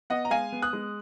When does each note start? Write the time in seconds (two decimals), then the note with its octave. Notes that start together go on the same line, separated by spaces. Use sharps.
0.10 B3 D#5 F#5
0.25 A#5
0.30 G#3 F5 G#5
0.52 B3
0.62 D#6 F#6
0.73 G#3